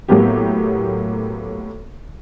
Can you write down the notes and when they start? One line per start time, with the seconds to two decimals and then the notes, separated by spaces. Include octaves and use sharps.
0.08 A2 F#3 A#3 B3 G4